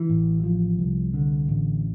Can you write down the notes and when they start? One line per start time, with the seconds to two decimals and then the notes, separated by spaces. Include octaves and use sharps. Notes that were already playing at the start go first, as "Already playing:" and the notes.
Already playing: E3
0.09 A1
0.44 F3
0.79 C2
1.14 D3
1.48 A1